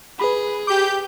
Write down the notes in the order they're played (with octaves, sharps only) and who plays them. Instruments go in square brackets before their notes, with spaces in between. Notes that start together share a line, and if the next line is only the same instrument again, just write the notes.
[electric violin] G#4 [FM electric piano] B4 B5
[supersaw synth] G4 G6 [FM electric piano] D6